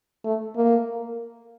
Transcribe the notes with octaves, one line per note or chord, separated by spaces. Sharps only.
A3
A#3